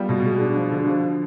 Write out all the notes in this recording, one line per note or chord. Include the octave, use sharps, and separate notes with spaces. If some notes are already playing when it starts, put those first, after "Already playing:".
Already playing: G3 B3 F4
B2
G#3
D4
F3
D3
F3